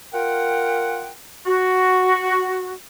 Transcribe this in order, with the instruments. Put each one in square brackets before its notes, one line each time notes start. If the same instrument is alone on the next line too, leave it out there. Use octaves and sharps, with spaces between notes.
[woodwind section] F4 A#4 F#5 G5
F#4